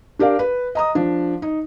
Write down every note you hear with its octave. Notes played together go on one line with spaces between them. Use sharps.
D4 G4 A#4 D5 F5
B4
D#5 A#5 D#6
F3 D4
D#4